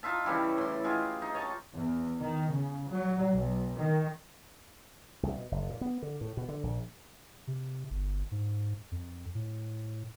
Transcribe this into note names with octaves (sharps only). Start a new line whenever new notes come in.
D#4 F4 E5 A5
C#3 E3 G3 E4
A2 C6
G#3 F4 G4 G#4
D#4
C#5 D#5 A5
E2
D#3
C#3
F#3
B1
D#3
C2
B2
F#1
A#2
B3
D3
A2
B2
D3
A#1
C3
G1
G#2
F2
A2